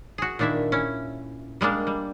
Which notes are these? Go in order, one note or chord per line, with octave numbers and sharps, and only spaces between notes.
F#4 G#4
A#2 D#3 D4 E4 E5
C#4 E4
G3 G#3 A#3 D4
G3